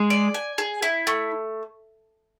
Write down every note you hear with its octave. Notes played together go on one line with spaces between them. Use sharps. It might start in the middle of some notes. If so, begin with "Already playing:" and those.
Already playing: G#3 G#4
D5
G#5
G#4
E4
A3